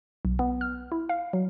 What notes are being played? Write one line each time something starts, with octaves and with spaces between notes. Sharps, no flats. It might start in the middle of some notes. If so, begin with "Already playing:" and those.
B1
B3
F6
E4
F5
F#3